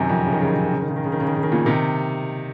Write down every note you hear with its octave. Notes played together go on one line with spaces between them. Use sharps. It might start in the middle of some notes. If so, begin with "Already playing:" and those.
Already playing: F#2 C3 D#3
F2
C#3
D#3
C#3
D#3
C#3
D#3
C#3
D#3
C#3
D#3
C#3
D#3
C#3
D#3
C#3
D#3
A#2 C#3
C3 D#3